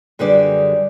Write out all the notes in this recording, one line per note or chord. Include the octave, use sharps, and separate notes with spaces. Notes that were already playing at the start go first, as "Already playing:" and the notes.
F#2 D3 G3 G#4 B4 D5